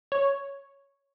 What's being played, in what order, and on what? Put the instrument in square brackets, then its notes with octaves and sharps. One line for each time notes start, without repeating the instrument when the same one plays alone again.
[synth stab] C#5